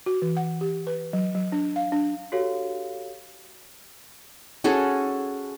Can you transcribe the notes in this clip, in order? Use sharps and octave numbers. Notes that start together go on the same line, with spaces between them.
F#4
E3
F#5
G4
B4
F#3
F#3
D4
F5
D4
F#4 G4 A4 C#5 F5
C#4 F#4 G#4 A4